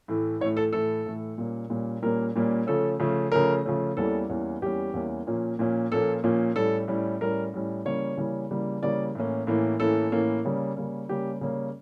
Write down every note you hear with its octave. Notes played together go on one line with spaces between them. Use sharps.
A2 E3 A3
A2 E3 A3 C#5
A4
A2 E3 A3 A4
A2 E3 A3
A#2 G3 A#3 C#4
A#2 G3 A#3 C#4
A#2 G3 A#3 C#4 A#4
A#2 G3 A#3 C#4
C#3 F3 A3 C#4 A4
C#3 F3 A3 C#4
C#3 F3 A3 C#4 A#4
C#3 F3 A3 C#4
E2 E3 G3 A#3 C#4 A4
E2 E3 G3 A#3 C#4
E2 E3 G3 A#3 C#4 G4
E2 E3 G3 A#3 C#4
A#2 F3 A#3 C#4
A#2 F3 A#3 C#4
A#2 F3 A#3 C#4 A4
A#2 F3 A#3 C#4
A2 G3 C#4 A4
A2 G3 C#4
A2 G3 C#4 A#4
A2 G3 C#4
C#3 E3 G3 A#3 C#4 C#5
C#3 E3 G3 A#3 C#4
C#3 E3 G3 A#3 C#4
C#3 E3 G3 A#3 C#4 D5
A2 E3 A#3 C#4
A2 E3 A#3 C#4
A2 E3 A#3 C#4 A4
A2 E3 A#3 C#4
C#3 G3 A#3 C#4
C#3 G3 A#3 C#4
C#3 G3 A#3 C#4 G4
C#3 G3 A#3 C#4